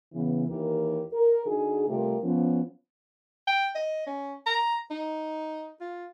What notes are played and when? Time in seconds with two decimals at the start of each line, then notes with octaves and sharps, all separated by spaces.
0.12 C#3 E3 B3
0.48 D#2 D#3 E3 G4 A#4
1.13 A#4
1.45 D3 D#4 F#4 G#4
1.88 C3 G3 A3 F4 G4 A#4
2.23 F3 B3 C#4
3.47 G5
3.75 D#5
4.07 C#4
4.46 A#5
4.90 D#4
5.81 F4